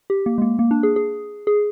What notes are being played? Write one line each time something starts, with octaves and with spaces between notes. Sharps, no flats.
G4
A#3
G#3
A#3
A#3
D4
G#4
G#4
G#4